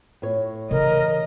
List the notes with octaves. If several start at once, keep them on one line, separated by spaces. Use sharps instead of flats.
A2 C#5
C#3 E3 A#4 D#5